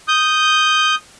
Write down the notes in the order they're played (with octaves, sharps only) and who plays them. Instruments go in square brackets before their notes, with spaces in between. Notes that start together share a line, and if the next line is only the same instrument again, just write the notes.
[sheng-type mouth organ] D#6 G6